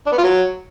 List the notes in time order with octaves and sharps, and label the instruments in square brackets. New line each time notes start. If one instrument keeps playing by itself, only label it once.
[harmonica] D4
B3
F4
F#3